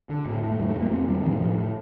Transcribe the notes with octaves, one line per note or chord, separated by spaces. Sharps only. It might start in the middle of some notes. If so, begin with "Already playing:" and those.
D3
A2
A2
A3
F2 G3
A3
C3
A#3
F2 C4
C3 G3
F3
A2 D#3
F3
A2
A2